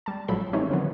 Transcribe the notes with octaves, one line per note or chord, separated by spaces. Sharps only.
G3 A5
A1 F3 F#3 G#3 A4 B5
E3 G3 A3 C4 C#4 D#4
D3 D#3 F3 F#3 A#3 B3